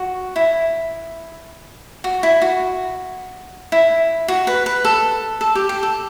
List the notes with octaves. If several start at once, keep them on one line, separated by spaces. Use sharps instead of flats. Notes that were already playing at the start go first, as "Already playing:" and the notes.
Already playing: F#4
E4
F#4
E4
F#4
E4
F#4
B4
B4
A4
A4
G4
G4
A4